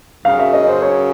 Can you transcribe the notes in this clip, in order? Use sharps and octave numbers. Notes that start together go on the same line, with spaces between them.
F#2 C#3 F#3 F5
E5
D#5
C5
C#5